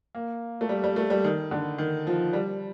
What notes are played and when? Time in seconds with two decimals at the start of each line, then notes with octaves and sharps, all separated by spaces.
0.15 A#3
0.61 A3
0.69 G3
0.84 G3
0.96 A3
1.10 G3
1.24 D#3
1.51 D3
1.78 D#3
2.07 F3
2.33 G3